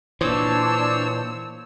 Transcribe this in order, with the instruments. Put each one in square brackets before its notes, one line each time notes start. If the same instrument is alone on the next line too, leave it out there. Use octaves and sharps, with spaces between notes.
[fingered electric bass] A#2 E3 [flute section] D4 [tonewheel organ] C5 C#5 [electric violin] E6